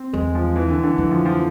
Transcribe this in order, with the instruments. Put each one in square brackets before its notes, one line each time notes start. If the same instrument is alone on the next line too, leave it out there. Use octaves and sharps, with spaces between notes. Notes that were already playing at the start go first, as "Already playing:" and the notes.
Already playing: [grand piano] C4
[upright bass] E2 [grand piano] G#3
[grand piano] F3
E3
D3
D3
[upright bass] F2 [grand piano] E3
[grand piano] F3
F3